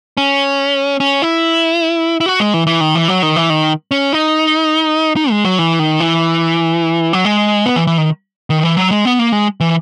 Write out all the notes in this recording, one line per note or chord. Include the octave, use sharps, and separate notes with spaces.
C#4
C#4
E4
E4
F#4
G#3
E3
E3
D#3
E3
F#3
D#3
E3
D#3
C#4
D#4
D#4
G#3
F#3
E3
D#3
E3
F#3
G#3
B3
E3
E3
D#3
D#3
E3
F#3
G#3
B3
A#3
G#3
E3